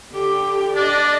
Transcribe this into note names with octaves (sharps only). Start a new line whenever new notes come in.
D3 G4
D4 D5 D#5